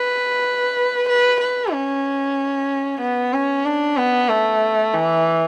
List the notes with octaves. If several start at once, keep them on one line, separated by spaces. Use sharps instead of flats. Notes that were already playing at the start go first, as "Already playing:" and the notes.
Already playing: B4
B4
B4
C#4
B3
C#4
D4
B3
A3
E3